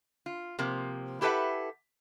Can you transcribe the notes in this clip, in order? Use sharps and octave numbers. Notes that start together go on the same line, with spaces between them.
F4
C3 F3 A#3
E4 G4 A4 B4 E5 F#5